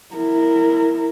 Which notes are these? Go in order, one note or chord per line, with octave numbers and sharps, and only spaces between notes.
E4 A#4